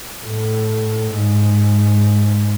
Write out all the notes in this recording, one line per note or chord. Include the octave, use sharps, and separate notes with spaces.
A2
G#2